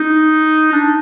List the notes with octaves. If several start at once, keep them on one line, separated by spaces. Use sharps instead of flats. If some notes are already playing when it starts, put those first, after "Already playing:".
Already playing: D#4
D4